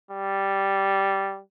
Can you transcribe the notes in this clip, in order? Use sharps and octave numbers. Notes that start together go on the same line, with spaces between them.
G3